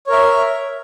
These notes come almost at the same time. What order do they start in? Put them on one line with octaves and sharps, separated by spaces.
C#5 A#4 E5